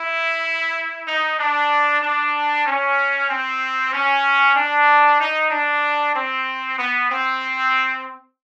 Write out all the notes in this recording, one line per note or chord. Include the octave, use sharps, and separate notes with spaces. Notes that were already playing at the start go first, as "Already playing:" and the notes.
Already playing: E4
D#4
D4
D4
C#4
C4
C#4
D4
D#4
D4
C4
B3
C4